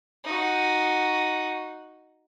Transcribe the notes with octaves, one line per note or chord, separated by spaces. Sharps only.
D#4 F#4